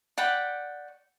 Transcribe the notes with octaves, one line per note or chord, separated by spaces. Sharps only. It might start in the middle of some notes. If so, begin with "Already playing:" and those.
D5 F#5 G5 B5